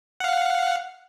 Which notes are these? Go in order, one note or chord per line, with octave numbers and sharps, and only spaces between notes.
F5 F#5